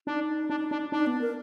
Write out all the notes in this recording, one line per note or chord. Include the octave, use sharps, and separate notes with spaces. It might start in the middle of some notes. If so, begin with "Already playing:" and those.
D4 D#4
D4
D4
D4 D#4
B3
A#4